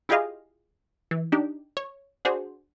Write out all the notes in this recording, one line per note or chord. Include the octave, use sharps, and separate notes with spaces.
E4 F4 G4 G#4 D#5 F5
E3
D4 D#4 G4
C#5
D4 F#4 G#4 C5